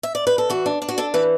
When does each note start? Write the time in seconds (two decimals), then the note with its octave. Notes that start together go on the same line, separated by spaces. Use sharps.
0.03 E5
0.15 D5
0.27 B4
0.38 A4
0.50 E3 F#4
0.66 D4
0.82 D4
0.89 F#4
0.98 D4 A4
1.14 E3 B4